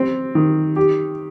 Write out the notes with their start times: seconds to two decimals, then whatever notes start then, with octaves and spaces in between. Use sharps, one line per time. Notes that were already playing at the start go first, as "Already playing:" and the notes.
Already playing: C4
0.35 D#3
0.76 G4